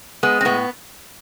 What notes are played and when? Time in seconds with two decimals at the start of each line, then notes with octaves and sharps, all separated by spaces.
0.23 G#3 B3
0.41 C4
0.45 A2 B3